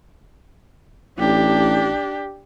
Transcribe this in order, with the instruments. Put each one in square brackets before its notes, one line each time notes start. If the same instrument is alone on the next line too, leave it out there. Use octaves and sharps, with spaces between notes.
[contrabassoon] A1 [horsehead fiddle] D4 G4